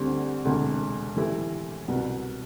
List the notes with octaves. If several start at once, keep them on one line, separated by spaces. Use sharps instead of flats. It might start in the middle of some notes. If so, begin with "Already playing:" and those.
Already playing: D2 D3 G3 C4 G4
E1 D2 C3
A2 E3 A3 E4 G4
C2 B2 B3